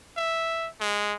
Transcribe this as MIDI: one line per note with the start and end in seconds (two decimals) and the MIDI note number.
0.17 0.69 76
0.80 1.16 56